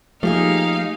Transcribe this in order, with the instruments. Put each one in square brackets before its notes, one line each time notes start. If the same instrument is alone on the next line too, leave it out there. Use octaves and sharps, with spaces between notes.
[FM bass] F3 [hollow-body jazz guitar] A3 G4 G#4 [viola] A#3 D#4 [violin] F5